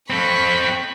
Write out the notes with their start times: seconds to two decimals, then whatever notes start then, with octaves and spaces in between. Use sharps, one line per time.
0.10 C4 A4 B5 C#6